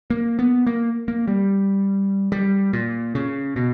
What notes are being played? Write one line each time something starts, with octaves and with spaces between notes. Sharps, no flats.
A#3
B3
A#3
A#3
G3
G3
A#2
C#3
B2